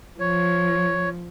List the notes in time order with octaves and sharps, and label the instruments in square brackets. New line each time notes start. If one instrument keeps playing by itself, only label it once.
[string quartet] F3 [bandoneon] C#5